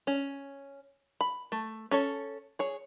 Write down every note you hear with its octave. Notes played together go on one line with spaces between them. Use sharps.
C#4
B5
A3
C#4 A4 C#5
G#4 C#5